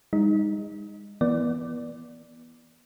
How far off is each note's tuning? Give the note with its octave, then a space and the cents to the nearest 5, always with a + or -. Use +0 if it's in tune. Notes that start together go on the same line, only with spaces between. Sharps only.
G#3 -40 D#4 +0
E3 +0 B3 -30 D5 +0